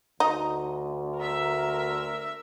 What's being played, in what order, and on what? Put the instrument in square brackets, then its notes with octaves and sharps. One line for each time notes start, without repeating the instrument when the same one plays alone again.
[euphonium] D2 [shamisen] D#4
[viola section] A#4 E5